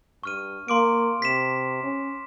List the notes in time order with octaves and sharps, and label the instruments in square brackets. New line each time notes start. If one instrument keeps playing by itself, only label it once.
[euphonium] G2 [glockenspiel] C#6 F6 D#7
[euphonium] A#3 [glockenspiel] C6 D6 D7
[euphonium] C3 [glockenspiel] B6 E7
[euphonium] C#4